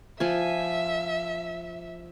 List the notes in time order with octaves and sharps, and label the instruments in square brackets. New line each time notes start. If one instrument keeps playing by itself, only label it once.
[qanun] F3 G#5 [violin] E5